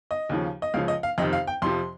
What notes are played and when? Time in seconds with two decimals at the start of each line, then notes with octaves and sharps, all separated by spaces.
0.11 D#5
0.29 D#2 C#3 F3
0.62 D#5
0.74 C#2 C#3 F3 F5
0.88 D#5
1.03 F5
1.18 F2 C3 D#3 D#5
1.33 F5
1.47 G5
1.62 F2 C3 F3 C6